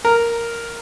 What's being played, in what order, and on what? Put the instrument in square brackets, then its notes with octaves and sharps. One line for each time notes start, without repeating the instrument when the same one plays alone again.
[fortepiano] A#4